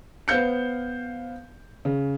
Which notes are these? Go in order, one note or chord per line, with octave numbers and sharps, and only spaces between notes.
B3 C5 F5 G6 C#7
C#3